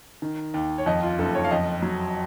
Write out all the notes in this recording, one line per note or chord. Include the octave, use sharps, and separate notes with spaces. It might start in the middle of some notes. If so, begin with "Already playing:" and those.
D#3
D#2
C#5
F2 D#5
F4
F#1 A4
C#5
F5
F2 D#5
F#3